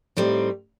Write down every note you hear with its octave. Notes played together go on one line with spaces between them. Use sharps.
A2 G3 C4 D#4